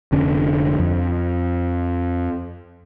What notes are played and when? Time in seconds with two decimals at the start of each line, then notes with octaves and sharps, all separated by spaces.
0.12 F1 D3 C#4
0.79 F2